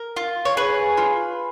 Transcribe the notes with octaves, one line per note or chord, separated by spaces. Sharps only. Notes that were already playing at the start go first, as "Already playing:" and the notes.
Already playing: A#4
F4
C#5
G#4 B4
F4